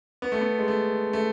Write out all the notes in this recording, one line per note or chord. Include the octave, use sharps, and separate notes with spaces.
B3
A3
B3
G#3
A3
A3